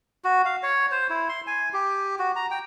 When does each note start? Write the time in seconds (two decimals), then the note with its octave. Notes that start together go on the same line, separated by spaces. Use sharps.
0.24 F#4
0.45 F5
0.63 C#5
0.92 C5
1.10 E4
1.29 C6
1.47 G#5
1.73 G4
2.19 F#4
2.36 A#5
2.51 G5